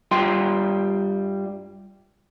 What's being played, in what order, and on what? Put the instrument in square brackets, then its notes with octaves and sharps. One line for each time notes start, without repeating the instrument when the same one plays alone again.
[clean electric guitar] G2 G3 F4 E5 G5 C6